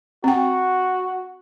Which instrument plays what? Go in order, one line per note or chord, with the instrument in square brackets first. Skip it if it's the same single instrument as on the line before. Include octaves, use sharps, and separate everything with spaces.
[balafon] C4 G5 [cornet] F#4